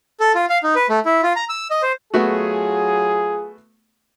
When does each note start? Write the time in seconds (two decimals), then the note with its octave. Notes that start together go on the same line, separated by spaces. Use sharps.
0.20 A4
0.35 F4
0.49 F5
0.63 D#4
0.75 B4
0.89 A3
1.05 E4
1.23 F4
1.36 A#5
1.49 E6
1.71 D#5
1.82 C5
2.14 F#3 A3 B3 F4 F#4 G#4